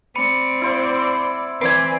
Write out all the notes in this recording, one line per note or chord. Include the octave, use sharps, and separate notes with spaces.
C4 D5 B5 C#7 D#7
E4 C5 F#5
E3 C4 B4 D5 G#5 C7 D7